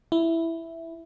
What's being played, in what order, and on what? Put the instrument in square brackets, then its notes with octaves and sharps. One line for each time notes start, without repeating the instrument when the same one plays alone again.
[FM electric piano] E4